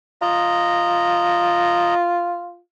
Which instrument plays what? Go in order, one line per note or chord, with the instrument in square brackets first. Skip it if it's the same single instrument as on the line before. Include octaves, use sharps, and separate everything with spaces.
[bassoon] F4 [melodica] D#5 A#5